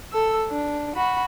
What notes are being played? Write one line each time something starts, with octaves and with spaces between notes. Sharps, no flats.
A4 E6
D4
F#4 B5